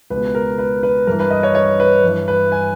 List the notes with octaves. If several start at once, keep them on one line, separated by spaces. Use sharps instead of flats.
C#2 B2 B4
A#4
B4
B4
G2 E3 A#4
B4
D#5
C#5
C#5
B4
G2 E3
B4
G#5